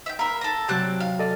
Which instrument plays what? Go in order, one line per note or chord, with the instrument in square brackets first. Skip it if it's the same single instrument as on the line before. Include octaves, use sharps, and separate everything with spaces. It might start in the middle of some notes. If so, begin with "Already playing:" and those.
[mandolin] E5 G5
[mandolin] A#4 E5 [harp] F5 B5
[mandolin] A4 A#5
[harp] C3 F#3 [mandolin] C4 D4 F#6
[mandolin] F5
[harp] A4 D5 D#5